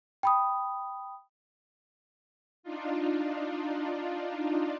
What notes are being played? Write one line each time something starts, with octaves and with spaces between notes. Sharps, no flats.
G5 B5 D#6
D4 D#4 F4